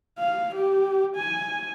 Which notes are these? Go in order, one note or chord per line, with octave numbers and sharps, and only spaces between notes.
F5
G4
G#5